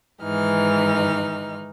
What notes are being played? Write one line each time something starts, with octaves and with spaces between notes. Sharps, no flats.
G#2 D#3 E3 D#4 F6